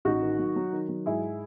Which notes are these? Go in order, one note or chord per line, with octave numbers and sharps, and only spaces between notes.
A1 D#4 F#4
D#3
F#3
F#3
D#3
F#3
G#2 E4 G#4